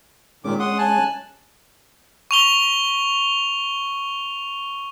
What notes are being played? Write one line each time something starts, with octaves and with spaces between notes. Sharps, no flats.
A#2 D#3 G#3 C#4 D6
F#5 C6 D#6
G#5 A5 F#6
C#6 F7 G7